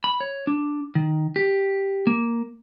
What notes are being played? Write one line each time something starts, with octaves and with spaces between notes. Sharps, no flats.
B5
C#5
D4
D#3
G4
A#3